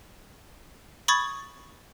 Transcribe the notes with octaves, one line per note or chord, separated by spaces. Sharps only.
B5 C#6 D#6 G#6 A6